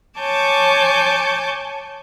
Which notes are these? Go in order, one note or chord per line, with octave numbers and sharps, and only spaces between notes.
C#5 G#5 A5 D6 G6